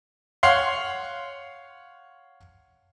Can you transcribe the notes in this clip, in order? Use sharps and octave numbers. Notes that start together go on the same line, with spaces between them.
C#5 F5 F#5 C6